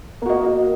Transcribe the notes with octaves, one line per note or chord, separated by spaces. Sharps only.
A#3 F#4 D#5